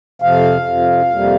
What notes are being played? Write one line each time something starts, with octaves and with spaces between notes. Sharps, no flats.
F2 C3 F3 F5
F2 C3 F3
F2 C3 G3 A#3